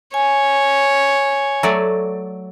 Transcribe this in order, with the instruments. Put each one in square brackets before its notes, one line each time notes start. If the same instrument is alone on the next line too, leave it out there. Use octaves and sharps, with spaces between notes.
[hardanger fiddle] C#5 [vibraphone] G#5
[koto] F#3 A3 D5